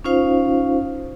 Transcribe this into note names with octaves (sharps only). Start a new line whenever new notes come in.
C#4 D#4 F4 C5 F5